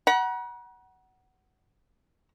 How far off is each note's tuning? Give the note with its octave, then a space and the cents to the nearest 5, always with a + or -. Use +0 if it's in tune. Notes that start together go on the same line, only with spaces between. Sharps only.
F#5 +15 A#5 +45